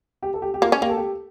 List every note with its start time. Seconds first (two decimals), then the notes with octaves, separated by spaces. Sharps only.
0.23 G4
0.34 A4
0.42 G4
0.54 G4
0.62 A#3 F4
0.72 C#4
0.81 A#3 G4
0.90 A4
0.97 G4